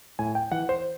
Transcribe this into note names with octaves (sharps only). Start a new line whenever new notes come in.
A2 G#5
G5
E3 F#5
C5